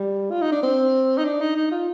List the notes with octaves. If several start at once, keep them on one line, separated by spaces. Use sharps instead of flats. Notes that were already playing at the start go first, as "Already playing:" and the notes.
Already playing: G3
F4
D#4
D4
C4
D#4
D4
D#4
D#4
F4